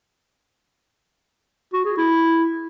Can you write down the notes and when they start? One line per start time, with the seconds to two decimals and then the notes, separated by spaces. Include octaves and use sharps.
1.73 F#4
1.85 G#4
1.97 E4